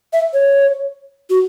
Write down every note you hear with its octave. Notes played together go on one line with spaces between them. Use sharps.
E5
C#5
F#4